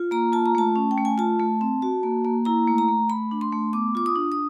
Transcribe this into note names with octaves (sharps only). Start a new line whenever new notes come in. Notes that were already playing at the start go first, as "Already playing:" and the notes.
Already playing: F4
A#3 A#5
F4 A5
A#5
A3 A5
C#4
G5
A3
G#5
F4 A5
A3
C4
F#4
A#3
A#3
E4 A#5
A3
A#5
A3
A3 B5
D4
C6
A3
B3 D6
F4 D6
D#6
D4
D#6